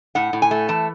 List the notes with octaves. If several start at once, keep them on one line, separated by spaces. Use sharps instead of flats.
A2 F#5
A2
G#5
A3
E3 A5